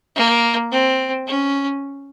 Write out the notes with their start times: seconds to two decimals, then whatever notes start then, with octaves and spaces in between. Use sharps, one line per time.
0.16 A#3
0.71 C4
1.27 C#4